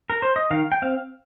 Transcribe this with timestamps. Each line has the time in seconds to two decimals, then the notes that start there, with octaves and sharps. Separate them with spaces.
0.10 A#4
0.22 C5
0.36 D#5
0.51 D#3 F5
0.72 G5
0.82 C4 F5